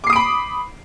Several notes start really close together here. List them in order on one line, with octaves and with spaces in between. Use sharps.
D6 C7 D#6 D7 B5